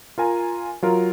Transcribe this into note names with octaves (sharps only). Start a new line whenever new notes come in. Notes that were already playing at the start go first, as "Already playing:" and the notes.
F4 A#4 G#5 A#5
F#3 F4 A#4